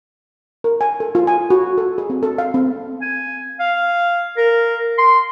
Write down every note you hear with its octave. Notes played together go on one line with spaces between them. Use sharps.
A#4
G#5
A4
F4
G#5
F#4
A4
G#4
C4
A4
F5
C4
G#5
F5
A#4
C6